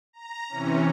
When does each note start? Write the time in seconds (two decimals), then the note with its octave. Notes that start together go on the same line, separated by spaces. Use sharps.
0.13 A#5
0.49 C3 E3 C#4